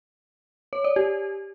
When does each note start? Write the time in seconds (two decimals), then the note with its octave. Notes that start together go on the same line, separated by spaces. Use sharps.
0.73 C#5
0.84 D5
0.96 G4